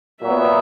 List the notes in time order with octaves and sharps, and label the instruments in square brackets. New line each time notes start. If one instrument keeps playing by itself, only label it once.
[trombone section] A#2 F#3 B3 [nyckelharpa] E5